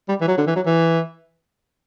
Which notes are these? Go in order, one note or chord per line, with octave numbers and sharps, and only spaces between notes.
G3
E3
F#3
D3
E3
F#3
E3